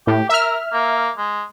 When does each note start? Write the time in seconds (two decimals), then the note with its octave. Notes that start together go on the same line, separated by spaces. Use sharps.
0.07 A2 G4
0.29 A#4 E5 F6
0.73 A#3
1.17 G#3